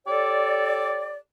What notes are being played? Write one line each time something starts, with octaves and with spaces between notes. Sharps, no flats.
G4 A4 C#5 D5